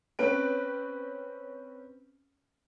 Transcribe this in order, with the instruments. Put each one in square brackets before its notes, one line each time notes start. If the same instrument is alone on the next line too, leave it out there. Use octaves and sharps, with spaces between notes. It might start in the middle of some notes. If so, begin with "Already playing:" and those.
[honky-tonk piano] C4 C#4 B4 D7